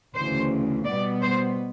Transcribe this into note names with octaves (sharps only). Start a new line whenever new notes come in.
D2 C#3 E3 C5
B2 G3 B3 D5
C5